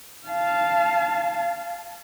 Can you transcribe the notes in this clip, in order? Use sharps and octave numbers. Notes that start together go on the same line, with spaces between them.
F5 A5